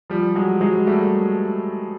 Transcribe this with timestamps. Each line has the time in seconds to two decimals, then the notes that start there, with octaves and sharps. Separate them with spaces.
0.10 F3 G3
0.35 F#3 G#3
0.61 F#3 G#3
0.87 G3 A3